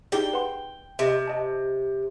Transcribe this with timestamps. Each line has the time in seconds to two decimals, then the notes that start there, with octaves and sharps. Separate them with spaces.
0.12 D#4 G4 G#4 G5
0.33 B4 F#5 C6
0.99 C3 D#5 E5
1.27 D#5 A5